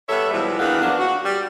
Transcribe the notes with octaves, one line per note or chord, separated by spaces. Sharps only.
G3 B3 A4 C#5 E5
B2 E3 F3 G3 G#3
D#3 E3 A#3 B3 D4 G#4
F3 F#3 A#3 B3 D4
F#4
G3